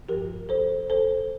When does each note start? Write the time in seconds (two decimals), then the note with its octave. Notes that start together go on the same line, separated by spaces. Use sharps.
0.09 G2 F3 G4 A#4
0.49 A4 C5
0.90 A4 C5